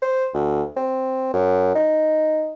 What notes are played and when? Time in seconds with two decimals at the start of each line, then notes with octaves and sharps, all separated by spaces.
0.02 C5
0.34 D2
0.77 C4
1.34 F#2
1.75 D#4